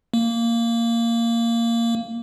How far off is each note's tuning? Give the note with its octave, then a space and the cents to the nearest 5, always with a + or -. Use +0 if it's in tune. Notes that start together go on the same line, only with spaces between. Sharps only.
A#3 -10